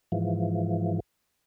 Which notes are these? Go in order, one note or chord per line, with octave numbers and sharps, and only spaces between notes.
G#2 E3 F3